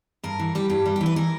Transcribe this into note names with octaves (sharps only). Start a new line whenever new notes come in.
G2 A#4
E3
G3 G4
G2 G4
G3
G4
E3
B4
E3 A#4